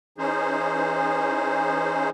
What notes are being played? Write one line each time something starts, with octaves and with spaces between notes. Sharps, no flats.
E3 C#4 D#4 G#4 C5